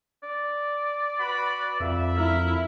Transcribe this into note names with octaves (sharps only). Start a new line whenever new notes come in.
D5
F#4 B4 B5
F2 E5 E6
E4 A#4